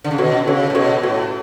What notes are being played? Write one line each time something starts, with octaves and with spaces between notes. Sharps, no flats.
D3
C#3
B2 F#4 A4 C#5
C#3 F#4 A4 C#5
A2
B2 F#4 A4 C#5
A2 F#4 A4 C#5